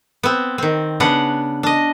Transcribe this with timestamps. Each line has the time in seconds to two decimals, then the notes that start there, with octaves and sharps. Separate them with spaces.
0.23 B3 C4
0.58 D#3 C4
1.00 C#3 B3 D4 F#5
1.63 D4 D#5